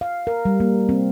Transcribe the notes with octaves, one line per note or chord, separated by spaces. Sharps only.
F5
A#4
G3
A#3
C4